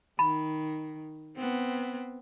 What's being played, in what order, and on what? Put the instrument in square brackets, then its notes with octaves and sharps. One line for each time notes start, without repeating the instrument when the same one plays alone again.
[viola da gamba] D#3 [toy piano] B5
[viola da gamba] B3 C4